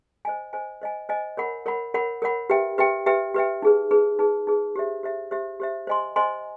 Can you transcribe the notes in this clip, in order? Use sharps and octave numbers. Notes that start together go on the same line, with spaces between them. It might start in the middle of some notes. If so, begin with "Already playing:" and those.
C5 D#5 G#5
C5 D#5 G#5
C5 D#5 G#5
C5 D#5 G#5
A#4 C#5 F#5 B5
A#4 C#5 F#5 B5
A#4 C#5 F#5 B5
A#4 C#5 F#5 B5
G4 B4 E5 G5
G4 B4 E5 G5
G4 B4 E5 G5
G4 B4 E5 G5
D#4 G#4 B4
D#4 G#4 B4
D#4 G#4 B4
D#4 G#4 B4
G4 C5 E5
G4 C5 E5
G4 C5 E5
G4 C5 E5
C5 D#5 G#5 C6
C5 D#5 G#5 C6